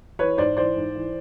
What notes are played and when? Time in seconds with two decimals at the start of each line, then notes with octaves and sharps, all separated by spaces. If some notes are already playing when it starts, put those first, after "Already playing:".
0.19 E3 B4 C#5
0.37 G#2 C5 D5
0.57 E3 C5 D5
0.76 G#2
0.95 E3